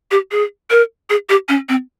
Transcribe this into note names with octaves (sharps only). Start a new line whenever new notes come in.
G4
G#4
A#4
G#4
G4
C#4
C4